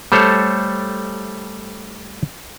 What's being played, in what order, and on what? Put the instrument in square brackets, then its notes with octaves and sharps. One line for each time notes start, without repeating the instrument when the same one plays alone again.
[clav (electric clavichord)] G3 A3 A4 C5 C#5